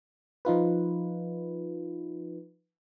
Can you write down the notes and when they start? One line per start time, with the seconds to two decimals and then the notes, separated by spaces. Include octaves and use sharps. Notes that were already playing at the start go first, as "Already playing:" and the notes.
0.45 F3 D#4 F4 B4